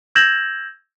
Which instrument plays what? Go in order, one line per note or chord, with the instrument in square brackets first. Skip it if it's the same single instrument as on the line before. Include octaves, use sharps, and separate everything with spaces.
[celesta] E6 G6 G#6 A#6 E7 F#7